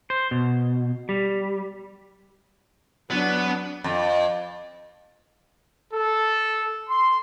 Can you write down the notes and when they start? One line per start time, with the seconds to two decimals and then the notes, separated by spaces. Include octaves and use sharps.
0.10 C5
0.31 B2
1.09 G3
3.11 F#3 B3 D4
3.84 F2
5.93 A4
6.88 C6